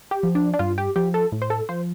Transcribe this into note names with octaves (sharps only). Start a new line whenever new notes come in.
G4
F3
D4
D4
G2 F4
G4
F3 G4
A4
A2
C5
A4
F3 C5